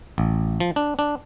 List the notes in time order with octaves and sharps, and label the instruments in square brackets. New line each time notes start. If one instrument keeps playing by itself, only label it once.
[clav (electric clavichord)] A1
F3
D4
D4